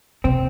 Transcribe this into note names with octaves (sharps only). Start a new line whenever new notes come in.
C3 C4